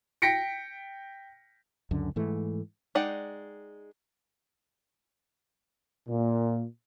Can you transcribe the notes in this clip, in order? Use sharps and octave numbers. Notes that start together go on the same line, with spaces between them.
G5 A#6 B6 C#7 D7
C#2 F#2 D3
G#2 E3 A3
G#3 D#4 D5 F#5 G5
A#2